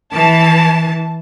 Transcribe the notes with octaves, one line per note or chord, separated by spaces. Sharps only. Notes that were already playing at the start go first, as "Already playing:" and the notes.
E3 A5